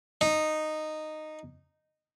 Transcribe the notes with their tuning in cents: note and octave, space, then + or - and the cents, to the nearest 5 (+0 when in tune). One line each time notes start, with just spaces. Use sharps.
D#4 -10